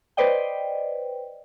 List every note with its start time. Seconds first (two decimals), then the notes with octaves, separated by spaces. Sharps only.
0.17 B4 C5 D5 D#5 G5